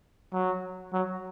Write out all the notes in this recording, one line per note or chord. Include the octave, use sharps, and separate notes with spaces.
F#3
F#3